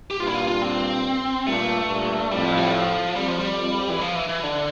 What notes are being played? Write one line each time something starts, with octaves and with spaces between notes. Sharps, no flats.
G4
G2 A#2 F4
E4
F4
F4
C4
G2 A#2 A3
G2 A#2
F2 A2 G3
F3
G3
F3
F2 G3
F3
G3
F2
E3
F3
E3
E3
D3